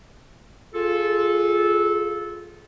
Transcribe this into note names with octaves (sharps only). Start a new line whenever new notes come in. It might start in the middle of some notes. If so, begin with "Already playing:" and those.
F4 G#4 A4